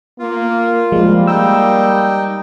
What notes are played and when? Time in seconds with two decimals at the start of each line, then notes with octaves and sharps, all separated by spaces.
0.19 A#3 F4
0.92 F3 G3 G#3 A#3
1.27 D#4 G5 E6